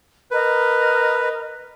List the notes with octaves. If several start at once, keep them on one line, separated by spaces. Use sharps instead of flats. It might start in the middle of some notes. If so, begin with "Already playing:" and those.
A#4 B4 D#5